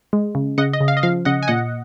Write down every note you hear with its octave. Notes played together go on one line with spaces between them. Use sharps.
G#3
C#3
C#3 D#5 F#5
D#5
C#3
F5
D#5
F3 F5
C#3 D#5 F#5
G#5
A#2 D#5 F#5